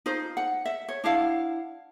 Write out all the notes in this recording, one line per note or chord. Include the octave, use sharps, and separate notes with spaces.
D#4 F4 C5
F#5
E5
C#5
D4 E4 F5 F#5